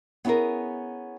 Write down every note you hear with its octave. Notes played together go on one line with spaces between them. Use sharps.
B3 C#4 E4 G#4 A#4